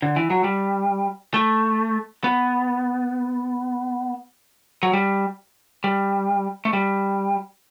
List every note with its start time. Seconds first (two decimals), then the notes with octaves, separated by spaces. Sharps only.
0.02 D3
0.16 E3
0.30 F#3
0.44 G3
1.34 A3
2.24 B3
4.83 F#3
4.93 G3
5.84 G3
6.65 A3
6.73 G3